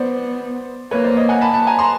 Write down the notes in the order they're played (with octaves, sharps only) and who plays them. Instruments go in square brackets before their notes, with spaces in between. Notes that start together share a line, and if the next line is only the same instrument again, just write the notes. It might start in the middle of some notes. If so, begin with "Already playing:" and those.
Already playing: [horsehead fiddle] B3 [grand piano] C5 D5
[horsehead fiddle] A#3 [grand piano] B4 C#5
[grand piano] C5 D5
C#5 D#5
F#5 G#5
A5 B5
A5 B5
G#5 A#5
A#5 C6